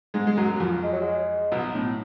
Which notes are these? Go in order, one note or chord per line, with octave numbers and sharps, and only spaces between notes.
G#2 G#3
G#3
F#2 F#3
F#3
F2 F3
G#3
F#3
G#3
B1 B2
A2